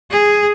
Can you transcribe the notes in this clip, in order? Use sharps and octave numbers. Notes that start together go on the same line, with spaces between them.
G#4